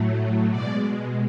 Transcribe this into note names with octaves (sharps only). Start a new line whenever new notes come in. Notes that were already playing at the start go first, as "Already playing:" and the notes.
Already playing: A2 F#3 A3
B2 G#3 D5